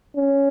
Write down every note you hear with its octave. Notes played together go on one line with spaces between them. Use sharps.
C#4